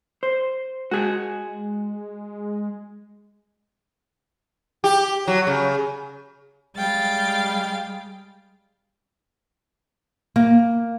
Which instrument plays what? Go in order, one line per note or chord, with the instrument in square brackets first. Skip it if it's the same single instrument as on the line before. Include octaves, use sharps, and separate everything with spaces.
[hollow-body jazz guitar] C5
[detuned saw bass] G#3 [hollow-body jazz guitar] F#4 G#4
[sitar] G4
F#3
C#3
[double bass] G3 G#3 [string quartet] F5 G5 A6
[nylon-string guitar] A#3